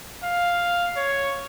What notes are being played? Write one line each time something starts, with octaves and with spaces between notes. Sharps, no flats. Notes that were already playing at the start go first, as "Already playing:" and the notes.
F5
C#5